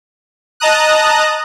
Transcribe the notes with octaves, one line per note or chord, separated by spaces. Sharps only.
D#5 A5 A#5 D#6 F#6